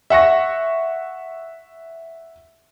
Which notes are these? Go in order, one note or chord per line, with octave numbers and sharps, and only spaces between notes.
E5 F#5 C#6 A#6